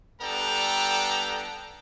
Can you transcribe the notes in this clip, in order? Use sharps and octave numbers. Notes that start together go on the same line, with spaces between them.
G3 B3 D4 A4 G5 A#5